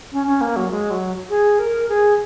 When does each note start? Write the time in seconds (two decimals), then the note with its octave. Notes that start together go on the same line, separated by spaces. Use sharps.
0.12 C#4
0.27 C#4
0.41 A#3
0.56 F#3
0.71 G#3
0.91 F#3
1.30 G#4
1.59 A#4
1.89 G#4